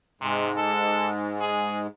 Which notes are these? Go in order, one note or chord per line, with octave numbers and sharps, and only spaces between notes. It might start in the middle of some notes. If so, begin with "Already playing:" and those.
G#2 C3 G#3
A4
G#4